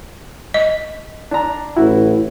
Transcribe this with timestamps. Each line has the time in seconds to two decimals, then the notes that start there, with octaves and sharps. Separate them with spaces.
0.54 D#5
1.31 D4 A#5
1.77 A1 E4 F#4